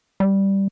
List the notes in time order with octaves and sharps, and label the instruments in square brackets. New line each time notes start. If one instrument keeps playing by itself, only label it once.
[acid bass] G3